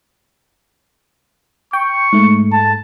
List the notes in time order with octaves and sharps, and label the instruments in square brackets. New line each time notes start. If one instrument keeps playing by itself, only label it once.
[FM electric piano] G5 [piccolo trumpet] C#6
[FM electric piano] G#2 A3
[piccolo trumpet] A5